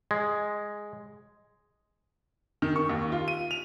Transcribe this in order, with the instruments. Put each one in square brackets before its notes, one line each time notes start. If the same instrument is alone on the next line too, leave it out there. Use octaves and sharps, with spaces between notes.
[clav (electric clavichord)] G#3
[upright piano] D#3
C#6
D#2
F4
D#7
F7